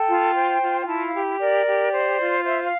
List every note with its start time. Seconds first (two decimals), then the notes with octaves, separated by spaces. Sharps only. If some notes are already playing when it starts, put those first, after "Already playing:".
Already playing: A4 G5
0.09 F4
0.35 C5
0.62 F4
0.79 G5
0.88 E4 A5
1.06 F5
1.14 G4
1.40 A#4 D5
1.66 G4
1.93 C5
2.19 F4
2.45 C5 E5
2.63 F5